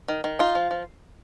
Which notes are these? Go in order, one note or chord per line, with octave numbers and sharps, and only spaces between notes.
D#3
D#3
D#4 F4
F3
F3